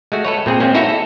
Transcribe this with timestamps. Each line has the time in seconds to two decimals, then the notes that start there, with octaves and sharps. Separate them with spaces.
0.12 G#3 A3 F#4
0.25 A4 B4 C#5
0.46 A#2 C4 G#4
0.60 G#3 A#3 C4 C#4
0.74 D#4 E4 F#4 A4 C#5 E5
0.89 A4